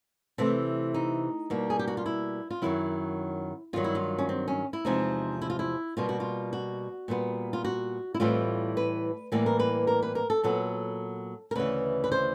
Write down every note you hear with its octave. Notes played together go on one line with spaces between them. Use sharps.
C3 E3 A3
D#4
B2 G3 A#3
G#4
G4
F#4
F4
E4
F4
F#2 D#3 F#3 E4
G2 D#3 F#3 F4
E4
F4
C#4
C4
C#4
E4
E2 C3 F3 G#3 D#4
E4
F4
E4
B2 G3 A#3 F4
F#4
F4
F#4
A#2 G3 B3
F4
F#4
E4
A2 E3 G3 C4 F4
B4
A2 E3 G3 A#3 B4
A#4
B4
A#4
B4
A#4
A4
A#2 F#3 B3 A4
A#4
D2 C#3 E3 B4
B4
C5